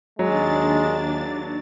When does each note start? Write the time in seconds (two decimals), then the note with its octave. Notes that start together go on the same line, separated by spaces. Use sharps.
0.19 D#2 F#3 G#3 D4 A6